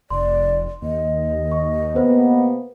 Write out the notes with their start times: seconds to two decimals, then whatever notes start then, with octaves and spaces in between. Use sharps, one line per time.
0.10 F1 D5 C6
0.82 D#2 D#5
1.52 C#6
1.96 C3 A#3 B3 B4 C5